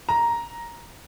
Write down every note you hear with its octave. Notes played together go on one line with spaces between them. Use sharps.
A#5